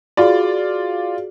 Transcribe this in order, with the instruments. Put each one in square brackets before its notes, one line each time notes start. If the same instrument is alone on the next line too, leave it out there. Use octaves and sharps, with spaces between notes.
[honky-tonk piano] F4 D5 [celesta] F#4 G#4